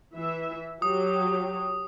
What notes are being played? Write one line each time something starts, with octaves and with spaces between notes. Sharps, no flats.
E3 E5
F#3 G4 D#6